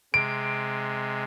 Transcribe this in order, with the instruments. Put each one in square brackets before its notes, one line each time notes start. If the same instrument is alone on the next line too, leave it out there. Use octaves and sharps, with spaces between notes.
[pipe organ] C3 G#3 [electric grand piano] D7